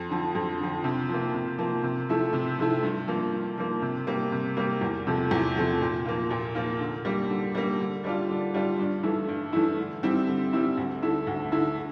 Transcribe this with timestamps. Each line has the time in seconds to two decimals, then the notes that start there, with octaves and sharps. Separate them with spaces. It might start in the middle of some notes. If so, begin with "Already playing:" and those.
Already playing: F2
0.10 D3 F3
0.35 F2
0.59 D3 F3
0.84 C3
1.09 F3 A#3
1.34 C3
1.58 F3 A#3
1.83 C3
2.09 F3 A3 E4
2.33 C3
2.59 F3 A3 E4
2.83 G2
3.08 F3 A#3
3.32 G2
3.58 F3 A#3
3.82 C3
4.07 G3 A#3
4.32 C3
4.57 G3 A#3
4.81 E2
5.07 C3 F3 A3
5.31 E2
5.56 C3 F3 A3
5.81 A#2
6.06 F3 A#3 F4
6.30 A#2
6.55 F3 A#3 F4
6.80 D3
7.05 G3 A#3
7.29 D3
7.55 G3 A#3
7.79 D3
8.04 G3 D4 F4
8.29 D3
8.54 G3 D4 F4
8.79 G2
9.03 E3 A3 E4
9.28 G2
9.53 E3 A3 E4
9.78 D3
10.03 G3 C4 E4
10.28 D3
10.53 G3 C4 E4
10.78 D2
11.02 D3 A3 E4
11.27 D2
11.52 D3 A3 E4
11.76 D3